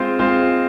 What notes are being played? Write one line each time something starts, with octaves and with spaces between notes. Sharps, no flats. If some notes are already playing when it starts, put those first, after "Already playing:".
Already playing: G#3 C4 F4 C5
G#3 C4 F4 C5